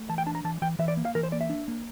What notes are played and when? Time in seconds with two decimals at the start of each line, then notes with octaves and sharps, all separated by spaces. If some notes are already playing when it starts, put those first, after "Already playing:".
Already playing: A3
0.09 E3 A5
0.18 G5
0.26 D4 A5
0.35 A#5
0.44 E3 A5
0.62 E3 G5
0.79 E3 E5
0.88 D5
0.97 A#3
1.05 F5
1.15 E3 A#4
1.23 C5
1.32 A#3 D5
1.41 E5
1.50 D4
1.68 A#3